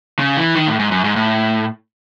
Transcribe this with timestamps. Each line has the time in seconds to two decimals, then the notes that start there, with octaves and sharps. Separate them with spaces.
0.19 C#3
0.37 E3
0.55 D#3
0.67 A2
0.79 G#2
0.91 F#2
1.04 G#2
1.16 A2